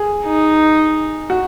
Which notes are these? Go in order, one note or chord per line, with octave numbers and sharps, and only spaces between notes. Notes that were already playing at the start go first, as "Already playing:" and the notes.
Already playing: G#4
D#4
F#4